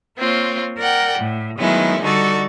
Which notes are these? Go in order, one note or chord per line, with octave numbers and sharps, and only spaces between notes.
A#3 C4 F4 C#5
A#4 D5 F#5 G5
A2
D#3 F#3 G#3 A3 B3 E4
D3 G3 D#4 F#4 A4 D5